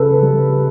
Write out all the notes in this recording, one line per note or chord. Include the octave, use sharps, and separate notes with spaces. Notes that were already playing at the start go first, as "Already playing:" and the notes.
Already playing: C#3 A4 B4
G3